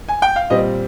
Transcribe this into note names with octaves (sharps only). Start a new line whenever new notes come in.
G#5
G5
F5
A#2 G3 C4 D#5